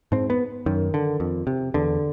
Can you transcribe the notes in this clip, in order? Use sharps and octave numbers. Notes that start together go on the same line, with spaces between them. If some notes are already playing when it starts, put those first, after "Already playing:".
G#2 C4
B3
F#2 D#3
D3
F2
C3
E2 D3